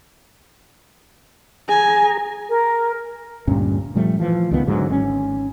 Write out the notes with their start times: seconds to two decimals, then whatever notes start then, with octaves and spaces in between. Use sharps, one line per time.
1.69 G#4 G#5 A#5
2.49 A#4
3.47 D2 G2 A#2 C#4
3.95 A#2 F3 G3 A3
4.20 E3 F3
4.51 C#2 D#3 E3 B3
4.67 G#2 D3 F#3
4.89 G#1 C3 C#4